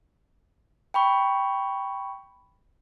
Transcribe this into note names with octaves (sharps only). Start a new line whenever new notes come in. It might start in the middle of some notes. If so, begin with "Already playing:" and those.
G5 B5 C#6